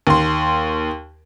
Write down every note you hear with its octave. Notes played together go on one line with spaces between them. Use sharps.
D#2 C6